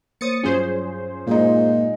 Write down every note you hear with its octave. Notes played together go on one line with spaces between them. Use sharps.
A#3 C5 C#5 D#6 A6 C#7
G2 F#3 C#4 F4 G#4 C5
A#2 G#3 D#4